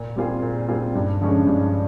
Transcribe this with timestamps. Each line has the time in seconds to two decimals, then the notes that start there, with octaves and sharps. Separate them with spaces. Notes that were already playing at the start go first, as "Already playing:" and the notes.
Already playing: A#2
0.16 G3 C4 F4 G#4
0.42 A#2
0.68 G3 C4 F4 G#4
0.95 G2
1.21 D3 F3 G#3 C#4
1.47 G2